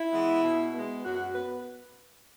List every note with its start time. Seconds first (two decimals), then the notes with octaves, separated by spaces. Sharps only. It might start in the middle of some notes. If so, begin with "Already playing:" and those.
Already playing: E4
0.12 E3 G#3 B3
0.43 B2
0.73 G#3 B3
1.03 F#2 F#4
1.35 B3 B4